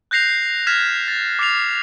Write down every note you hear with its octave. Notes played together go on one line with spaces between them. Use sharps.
F#6 G6 A#6 C7 F7
F6 G#6 B6 E7
A6
D6 A6 C7 F7